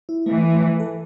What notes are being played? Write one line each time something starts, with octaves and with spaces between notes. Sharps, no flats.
E4
E3 A3
A3
F3
A4